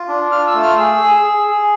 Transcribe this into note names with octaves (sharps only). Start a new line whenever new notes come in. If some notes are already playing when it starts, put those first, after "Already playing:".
Already playing: F4
D4
F4 F6
E6
A3
F6
G#4 E6
G#4
G#4
G#4